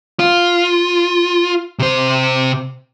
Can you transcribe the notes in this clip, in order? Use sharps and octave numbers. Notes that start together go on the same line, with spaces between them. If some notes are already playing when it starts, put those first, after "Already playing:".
F4
C3 C5